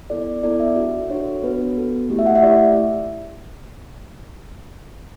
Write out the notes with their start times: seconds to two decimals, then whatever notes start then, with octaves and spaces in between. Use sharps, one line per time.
0.10 B3 E4 A4 D5
0.43 B3 E4 A4 D5
0.60 E5
0.76 D4 F#4 A4
1.10 D4 F#4 A4 C#5
1.43 B3 F#4 A4 B4
1.76 B3 F#4 A4
2.10 A3 E4 G4
2.19 E5
2.26 F#5
2.35 E5
2.43 A3 E4 G4 D5